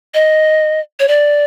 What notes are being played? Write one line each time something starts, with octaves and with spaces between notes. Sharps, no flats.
D#5
C#5
D5